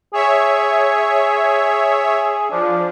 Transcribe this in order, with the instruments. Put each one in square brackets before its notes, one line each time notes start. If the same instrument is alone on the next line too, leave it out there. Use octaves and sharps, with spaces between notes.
[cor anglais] G#4 [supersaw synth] C#5 E5
[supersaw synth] F3 [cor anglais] D4